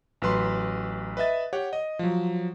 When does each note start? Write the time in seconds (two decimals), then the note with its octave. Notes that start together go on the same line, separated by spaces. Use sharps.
0.22 A1 F#3 B4 C6
1.17 B4 D#5 E5 A6
1.53 G4 C#5 F#5
1.73 D#5
1.99 F3 F#3